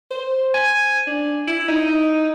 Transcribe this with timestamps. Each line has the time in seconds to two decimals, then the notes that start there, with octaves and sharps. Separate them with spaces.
0.11 C5
0.54 G#5
1.07 D4
1.47 E4
1.68 D#4